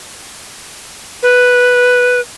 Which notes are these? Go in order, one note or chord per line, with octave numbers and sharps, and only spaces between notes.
B4